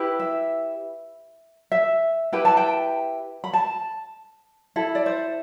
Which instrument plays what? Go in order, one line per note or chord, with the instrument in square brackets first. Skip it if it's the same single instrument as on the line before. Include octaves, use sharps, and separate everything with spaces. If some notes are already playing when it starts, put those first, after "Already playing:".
Already playing: [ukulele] E4 G4 B4
E5
E5
E4 G4 B4 G5
A5
G5
B5
A5
E4 A4
D5
C5